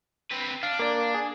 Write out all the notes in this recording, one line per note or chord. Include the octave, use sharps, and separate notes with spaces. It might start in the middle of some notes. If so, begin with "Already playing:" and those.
C4 B4
D4 F5
A#3 D5
G#4